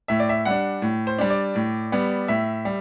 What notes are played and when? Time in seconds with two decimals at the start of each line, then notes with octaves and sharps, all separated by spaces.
0.08 A2 E5
0.20 D5
0.29 E5
0.45 G3 D4 F#5
0.82 A2
1.07 C5
1.19 G3 D4
1.30 D5
1.55 A2
1.92 G3 B3
2.28 A2 E5
2.65 G3